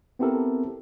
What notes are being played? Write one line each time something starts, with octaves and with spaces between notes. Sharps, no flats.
B3 C4 E4 G4 A4 A#4